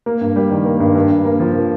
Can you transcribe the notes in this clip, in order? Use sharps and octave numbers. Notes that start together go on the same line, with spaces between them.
A#3
G2
G3
D#3
A#3
G2
G2
G2
A#3
F3